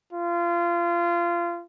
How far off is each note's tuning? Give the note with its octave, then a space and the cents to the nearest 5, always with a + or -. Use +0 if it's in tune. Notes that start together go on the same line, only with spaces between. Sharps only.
F4 -25